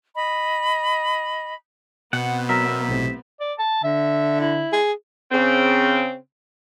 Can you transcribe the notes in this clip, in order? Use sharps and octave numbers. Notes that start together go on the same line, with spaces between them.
D#5 B5
B2 B3 C4 F#5
F#3 A#4 E5
B1 A2 C3
D5
A5
D3 E5
E4
G#4
C#3 C4